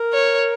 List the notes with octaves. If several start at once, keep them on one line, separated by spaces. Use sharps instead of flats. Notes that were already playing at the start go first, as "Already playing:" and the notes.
Already playing: A#4
C#5